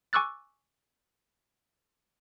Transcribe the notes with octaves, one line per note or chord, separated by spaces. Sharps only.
G#5 C#6 D6 E6 F#6 A6